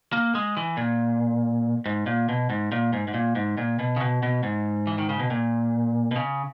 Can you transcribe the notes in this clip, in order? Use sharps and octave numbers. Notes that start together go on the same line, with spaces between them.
A#3
G#3
E3
A#2
G#2
A#2
B2
G#2
A#2
G#2
G#2
A#2
G#2
A#2
B2
C#3
B2
B2
G#2
E3
D#3
C#3
B2
A#2
B2
C#3